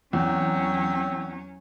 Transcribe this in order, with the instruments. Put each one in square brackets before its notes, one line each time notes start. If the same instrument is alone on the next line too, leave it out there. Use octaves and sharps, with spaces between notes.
[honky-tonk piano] E2 [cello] F#3 C#4 [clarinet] C4